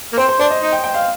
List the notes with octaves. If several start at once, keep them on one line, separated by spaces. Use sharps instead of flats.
A#3
C4 C5
C5
D4 C5
D#5
D#4
G5
G5
F5